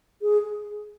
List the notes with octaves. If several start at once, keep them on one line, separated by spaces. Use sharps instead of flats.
G#4